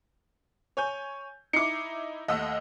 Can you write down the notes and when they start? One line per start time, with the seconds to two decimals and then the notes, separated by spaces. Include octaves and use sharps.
0.77 C#5 G#5 G6
1.53 D#4 E4 D6 C7 C#7
2.28 D#2 A3 D#5 F#5 E6